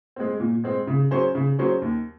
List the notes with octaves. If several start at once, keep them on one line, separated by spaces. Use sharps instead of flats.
G#3 C4
A#2
G#3 C4
C#3
F#3 C#4 G#4 C5
C#3
F#3 C#4 G#4 C5
D#2